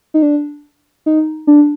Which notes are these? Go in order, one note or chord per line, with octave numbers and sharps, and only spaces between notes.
D#4
D4
D#4
D4